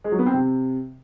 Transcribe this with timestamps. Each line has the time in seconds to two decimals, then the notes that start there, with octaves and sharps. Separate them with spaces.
0.04 G#3
0.12 F#3
0.19 B3
0.26 C4
0.34 C3